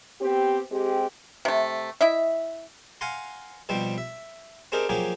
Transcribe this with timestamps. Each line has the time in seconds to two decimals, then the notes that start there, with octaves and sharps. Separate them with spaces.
0.21 B3 C4 G4
0.70 G#3 C4 G4
1.45 C3 A3
2.01 E4 D#5 E5
3.01 F5 F#5 G#5 A#5 C6
3.69 B2 F3 G3 C4
3.98 E5
4.72 C4 D4 D#4 G4 G#4 A#4
4.89 F3 F#3 A#3 G4 G#4